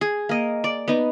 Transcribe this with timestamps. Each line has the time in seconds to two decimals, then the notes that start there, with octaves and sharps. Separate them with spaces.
0.01 G#4
0.29 A#3 D#5
0.64 D5
0.88 B3 D#4